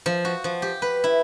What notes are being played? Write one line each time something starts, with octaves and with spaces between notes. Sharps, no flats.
F3
F#4
F3
G4
B4
E4